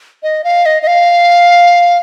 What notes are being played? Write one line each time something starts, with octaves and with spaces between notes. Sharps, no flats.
D#5
F5
D#5
D#5
F5